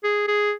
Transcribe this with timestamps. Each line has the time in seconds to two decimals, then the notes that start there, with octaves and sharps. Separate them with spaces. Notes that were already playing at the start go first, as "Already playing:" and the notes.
0.04 G#4
0.28 G#4